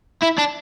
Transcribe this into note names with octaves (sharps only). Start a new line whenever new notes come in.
E4
D4